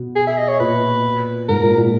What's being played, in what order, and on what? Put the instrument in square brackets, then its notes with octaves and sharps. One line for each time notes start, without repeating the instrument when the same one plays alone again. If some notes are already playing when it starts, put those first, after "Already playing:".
Already playing: [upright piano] B2
[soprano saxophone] G#4
E5
D#5
C#5
[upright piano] A#2 [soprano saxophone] B4
[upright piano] G#2 [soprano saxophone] A#4
[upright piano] A#2
A#2